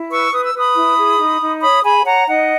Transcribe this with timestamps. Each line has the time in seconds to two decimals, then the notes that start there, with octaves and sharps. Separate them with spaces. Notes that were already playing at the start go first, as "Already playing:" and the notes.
Already playing: E4
0.11 B4 C#6 E6
0.33 B4 D#6
0.45 E6
0.54 B4 B5 D#6
0.75 E4
0.97 G#4
1.19 D#4
1.41 D#4
1.62 C#5 B5 D#6
1.84 G#4 G#5 B5
2.06 C#5 F#5 A#5
2.28 D#4 D#5 F#5